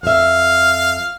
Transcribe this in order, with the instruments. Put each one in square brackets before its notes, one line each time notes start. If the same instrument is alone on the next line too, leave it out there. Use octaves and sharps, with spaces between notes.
[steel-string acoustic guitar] F2 E5 [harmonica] F5